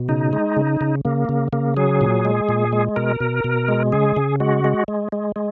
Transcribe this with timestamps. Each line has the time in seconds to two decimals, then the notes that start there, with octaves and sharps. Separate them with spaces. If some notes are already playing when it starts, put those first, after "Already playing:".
Already playing: B2
0.09 C#3 D#4
0.33 G#3
0.57 C#3
0.81 C#3
1.05 C#3 A#3
1.29 C#3
1.53 C#3 A#3
1.77 F#3 G#4
2.01 A#2
2.25 G#3
2.49 A#2
2.73 G#3
2.96 B2 A#4
3.20 B2
3.44 B2
3.68 G#3
3.92 C#3 G#4
4.16 C#3
4.40 G#3 F#4
4.64 G#3
4.88 G#3
5.12 G#3
5.36 G#3